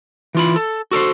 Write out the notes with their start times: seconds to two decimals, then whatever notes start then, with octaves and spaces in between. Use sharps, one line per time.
0.35 E3 F4 B5
0.56 A4
0.91 F#4 A4 A#4 C5